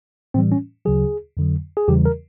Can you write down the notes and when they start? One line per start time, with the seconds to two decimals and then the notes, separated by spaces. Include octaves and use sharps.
0.34 A2 E3 G3 C4
0.52 C#4
0.85 D2 C#3 F#3 G#4
1.37 F2 D3 F#3
1.77 G#4
1.88 E2 C#3 E3 G3 G4
2.05 A#4